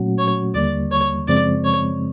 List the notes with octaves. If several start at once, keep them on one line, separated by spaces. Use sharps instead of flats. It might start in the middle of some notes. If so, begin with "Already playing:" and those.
Already playing: A#2 F#3 A3 C#4 F#4
C#5
D#2 D3 G3 A#3 D5
C#5
F#2 C#3 F3 G#3 C4 D5
C#5